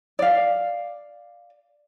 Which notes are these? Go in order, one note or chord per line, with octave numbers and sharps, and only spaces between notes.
D5 F5